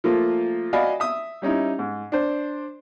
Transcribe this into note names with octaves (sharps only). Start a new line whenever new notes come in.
F3 A3 A#3 F4
F#4 D5 D#5 F5 G#5 B5
E5 D#6
G3 C#4 D#4 E4
G#2
D4 C5